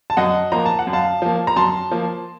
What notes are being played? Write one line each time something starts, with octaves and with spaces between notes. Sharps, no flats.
A5
F#2 D#5 F#5
F3 A#3 A#5
A5
F#5
F#2
F5 A5
F3 A#3
A#5
F#2 A5 C6
F3 A#3